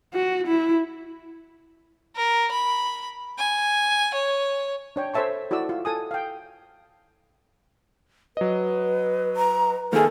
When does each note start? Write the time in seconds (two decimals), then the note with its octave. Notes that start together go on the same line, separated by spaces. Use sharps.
0.13 F#4
0.47 E4
2.16 A#4
2.51 B5
3.38 G#5
4.14 C#5
4.96 D4 C#5 G5
5.14 A4 C5 C#5 E5 A5 C#6
5.51 E4 F#4 A4 D5 E6
5.69 F4
5.85 A4 G#5 D#6
6.11 F5 G5
8.37 F#3 B4 D#5
9.37 A#5
9.93 D#3 A#3 G#4 A4